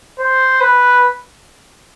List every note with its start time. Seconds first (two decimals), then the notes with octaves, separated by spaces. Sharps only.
0.19 C5
0.61 B4